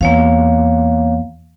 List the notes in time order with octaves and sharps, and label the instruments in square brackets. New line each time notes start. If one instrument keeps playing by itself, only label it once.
[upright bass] E2 [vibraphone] A#3 C#5 F5